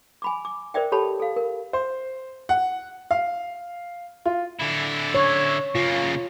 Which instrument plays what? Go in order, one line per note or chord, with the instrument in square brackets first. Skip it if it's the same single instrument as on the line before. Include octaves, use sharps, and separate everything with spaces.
[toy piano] G#5 B5 D6
D6
A#4 C5 D5 E5 G5
G4 A4 C#5 A5 B5
A4 F5
A#4
[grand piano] C5
F#5
F5
F4
[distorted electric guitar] D3 E4
[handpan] C#5
[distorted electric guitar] C#3 A#3 [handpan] F4